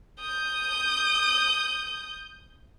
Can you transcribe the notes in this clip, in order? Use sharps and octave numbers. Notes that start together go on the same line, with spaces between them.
D#6 G6